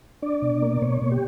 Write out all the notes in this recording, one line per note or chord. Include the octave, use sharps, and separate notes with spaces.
D4 D5
B2
A#3
B2 C#5
B2
G4